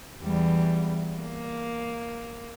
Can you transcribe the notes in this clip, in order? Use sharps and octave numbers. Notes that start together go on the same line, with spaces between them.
E2 G3
A#3